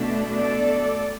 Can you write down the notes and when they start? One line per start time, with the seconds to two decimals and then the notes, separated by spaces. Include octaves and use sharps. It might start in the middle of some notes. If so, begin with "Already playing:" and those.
Already playing: B2 A3 D4
0.29 A4 D5